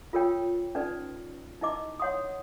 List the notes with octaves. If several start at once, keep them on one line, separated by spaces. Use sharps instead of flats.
F4 A4 A#4 C#5 G5
C#4 D#4 A4 B4 D5
D#4 E4 A#4 D#5 D6
C#5 F#5 C6 D#6